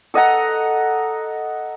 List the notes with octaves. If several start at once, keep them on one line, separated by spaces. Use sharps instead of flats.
A4 D#5 F#5 A#5